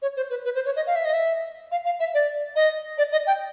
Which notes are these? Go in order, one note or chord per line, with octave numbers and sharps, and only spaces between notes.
C#5
C5
B4
B4
C5
C#5
D#5
F5
E5
D#5
E5
F5
F5
E5
D5
D#5
D5
D#5
G5